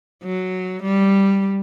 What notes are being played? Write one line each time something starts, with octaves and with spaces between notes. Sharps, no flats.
F#3
G3